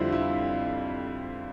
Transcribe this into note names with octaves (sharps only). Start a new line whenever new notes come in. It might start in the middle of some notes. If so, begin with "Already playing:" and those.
Already playing: F2 D3 G3 C4 E4 F4
E4